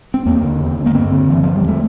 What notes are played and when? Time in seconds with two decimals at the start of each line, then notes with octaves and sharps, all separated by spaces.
0.14 C4
0.26 E2 A#3
0.43 D3
0.60 E2
0.77 D3
0.86 A#3
0.95 G2 C4
1.12 D3
1.28 G2 E3
1.43 D3 F3
1.56 G3
1.62 E2
1.68 A3